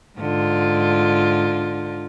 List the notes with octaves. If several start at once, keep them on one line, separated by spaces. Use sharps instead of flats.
G#2 D3 F4